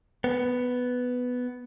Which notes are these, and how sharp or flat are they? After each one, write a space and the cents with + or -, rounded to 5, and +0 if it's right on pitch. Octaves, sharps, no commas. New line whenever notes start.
B3 +5